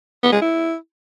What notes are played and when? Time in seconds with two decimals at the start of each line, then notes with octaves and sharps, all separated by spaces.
0.23 B3
0.32 G#3
0.42 E4